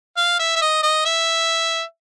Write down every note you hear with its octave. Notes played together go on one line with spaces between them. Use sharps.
F5
E5
E5
D#5
D#5
E5